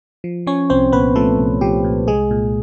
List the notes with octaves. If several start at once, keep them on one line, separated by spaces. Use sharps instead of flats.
F3
F3 C#4 C#5
C2 C4 C5
A#2 B3 B4
F3 A3 A4
C2
F3 G4
A#2
C2 G#3 G#4
A#2